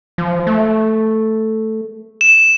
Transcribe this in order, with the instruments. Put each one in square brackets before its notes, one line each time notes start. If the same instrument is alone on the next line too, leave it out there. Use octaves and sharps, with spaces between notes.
[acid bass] F3
A3
[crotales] E7